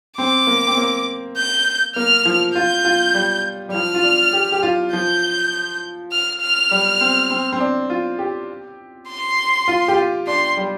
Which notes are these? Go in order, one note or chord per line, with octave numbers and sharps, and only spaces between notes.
C4 D6
A#3
C4
A#3
G6
A#3 F6
F3
F4 G6
F4
G3
G3
F3 F6
F4
D4
G4
G4
F4
F3 G6
F6
F6
G3
C4
C4
C4
D4
F4
G4
C6
F4
G4
F4
D4 C6
G3